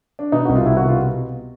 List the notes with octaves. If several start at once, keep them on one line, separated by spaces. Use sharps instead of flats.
D4
B2 D#4
C2 F#4
F4
C2 E4
F#4
B2
F4